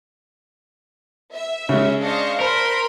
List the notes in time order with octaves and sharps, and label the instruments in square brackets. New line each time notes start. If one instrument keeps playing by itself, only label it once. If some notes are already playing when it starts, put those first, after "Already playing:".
[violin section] E5
[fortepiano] C#3 G#3 [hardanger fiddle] C#4
[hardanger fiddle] D4 C5 [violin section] D#5 F5 C#6
[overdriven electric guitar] A#4 [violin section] C5 [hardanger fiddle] B5 C6